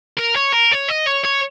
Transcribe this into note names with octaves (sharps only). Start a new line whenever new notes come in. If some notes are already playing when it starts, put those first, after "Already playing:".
A#4
C#5
A#4
C#5
D#5
C#5
C#5